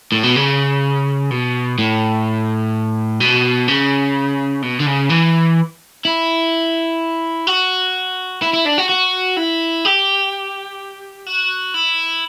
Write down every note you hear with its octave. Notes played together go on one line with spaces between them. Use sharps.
A2
B2
C#3
B2
A2
B2
C#3
B2
D3
C#3
E3
E4
F#4
E4
E4
D4
F#4
F#4
E4
G4
F#4
E4